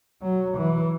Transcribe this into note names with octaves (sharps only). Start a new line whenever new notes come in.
F#3
E3